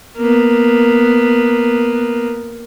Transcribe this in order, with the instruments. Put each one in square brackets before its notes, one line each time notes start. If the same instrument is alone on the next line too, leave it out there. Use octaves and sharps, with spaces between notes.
[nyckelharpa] A#3 B3